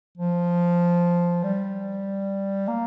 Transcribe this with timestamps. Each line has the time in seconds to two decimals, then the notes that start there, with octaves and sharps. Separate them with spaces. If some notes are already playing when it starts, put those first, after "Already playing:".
0.18 F3
1.43 G3
2.68 A#3